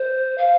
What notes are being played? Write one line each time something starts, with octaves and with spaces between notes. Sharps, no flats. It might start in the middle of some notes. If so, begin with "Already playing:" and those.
Already playing: C5
F5